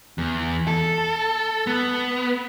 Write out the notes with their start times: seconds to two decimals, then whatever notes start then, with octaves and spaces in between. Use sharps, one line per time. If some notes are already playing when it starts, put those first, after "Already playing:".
0.18 E2
0.68 A4
1.67 B3